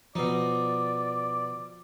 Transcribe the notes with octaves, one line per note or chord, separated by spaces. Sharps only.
B2 F3 D#4 D5